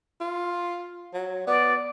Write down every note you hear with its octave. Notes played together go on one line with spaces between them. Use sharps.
F4
F#3
B3 D5